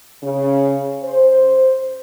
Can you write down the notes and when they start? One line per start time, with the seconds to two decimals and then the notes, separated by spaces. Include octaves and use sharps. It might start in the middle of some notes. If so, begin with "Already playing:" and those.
0.22 C#3
1.03 C5